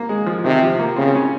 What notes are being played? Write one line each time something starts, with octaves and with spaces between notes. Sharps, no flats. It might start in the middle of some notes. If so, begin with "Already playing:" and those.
Already playing: A#3
G#3
F3
C3 D#3
F3
A#3
C#3 C4
C#4